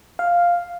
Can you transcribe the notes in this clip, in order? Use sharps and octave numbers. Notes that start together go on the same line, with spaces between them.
F5